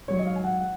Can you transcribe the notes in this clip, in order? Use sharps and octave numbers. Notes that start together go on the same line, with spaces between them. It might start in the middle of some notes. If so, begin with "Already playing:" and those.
G#2 F#3 C#5
D#5
F5
G#5
F#5
F#5